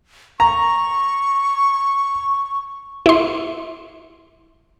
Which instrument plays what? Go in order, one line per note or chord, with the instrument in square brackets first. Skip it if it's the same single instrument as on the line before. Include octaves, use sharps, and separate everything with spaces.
[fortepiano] A#5 [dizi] C#6
[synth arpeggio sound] E4 C6